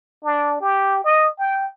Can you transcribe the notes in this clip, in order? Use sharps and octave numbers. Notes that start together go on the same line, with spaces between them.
D4
G4
D#5
G5